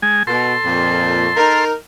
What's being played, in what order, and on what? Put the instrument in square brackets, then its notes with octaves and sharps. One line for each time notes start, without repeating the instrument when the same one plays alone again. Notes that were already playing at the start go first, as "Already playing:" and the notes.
[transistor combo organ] G#3 G#5
[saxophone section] B2 [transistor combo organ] A4 C6
[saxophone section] F2 A#2
D#4 A#4